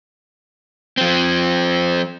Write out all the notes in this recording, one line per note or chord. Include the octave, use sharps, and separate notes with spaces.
F3 C4